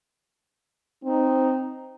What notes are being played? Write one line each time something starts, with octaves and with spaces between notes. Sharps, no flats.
C4 D#4